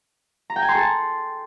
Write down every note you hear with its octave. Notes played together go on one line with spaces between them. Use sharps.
A#5
G5
G#5
C6
A4